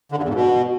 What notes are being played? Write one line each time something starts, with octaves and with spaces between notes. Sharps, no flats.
D3
G2
E2
G#2
B2